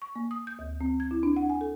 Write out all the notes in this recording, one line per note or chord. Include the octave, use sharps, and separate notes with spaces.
C#6
A#3
D#6
G6
D2
C4
G#6
E4
D4
F#5
G#5
A4